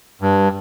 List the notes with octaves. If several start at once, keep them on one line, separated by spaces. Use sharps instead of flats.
G2